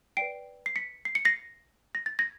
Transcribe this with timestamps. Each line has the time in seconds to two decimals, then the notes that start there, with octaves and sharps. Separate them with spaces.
0.17 B4 D5 G5 C7 D7
0.66 C7
0.76 B6 C#7
1.05 C7
1.15 C#7
1.25 A#6 C7
1.95 A#6
2.06 A6
2.19 G#6 A#6